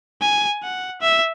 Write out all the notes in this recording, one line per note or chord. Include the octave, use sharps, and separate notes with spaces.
G#5
F#5
E5